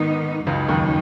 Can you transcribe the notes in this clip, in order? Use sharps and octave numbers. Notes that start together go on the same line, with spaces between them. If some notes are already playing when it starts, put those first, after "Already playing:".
Already playing: G#2 D#3 B3 D#4
C#2 F#2 C#3 F#3 D#4
D#2 D#3